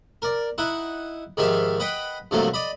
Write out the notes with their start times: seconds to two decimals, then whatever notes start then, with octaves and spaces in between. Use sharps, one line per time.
0.22 A#4 D5
0.58 D#4 E4 F#5
1.37 G#2 D#3 F3 G4 E5 F5
1.80 B4 D#5 F#5 G5 B5
2.31 G2 C3 F3 F#3 A3 A#3
2.53 D5 D#5 B5